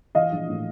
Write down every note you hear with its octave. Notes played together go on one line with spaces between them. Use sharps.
E3 D#5 F5
A#1
A2